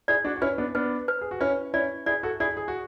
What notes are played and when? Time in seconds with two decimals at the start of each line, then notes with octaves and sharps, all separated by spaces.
0.08 E4 G#4 D5
0.25 D4 F#4
0.36 F#4
0.41 C#4 E4 B4
0.58 B3 D4
0.75 B3 D4 B4
1.08 B4
1.21 G#4
1.31 F#4
1.41 C#4 E4 B4
1.74 C#4 E4 D5
2.06 E4 G#4 D5
2.23 F#4 A4
2.40 E4 G#4 D5
2.57 G#4
2.68 F#4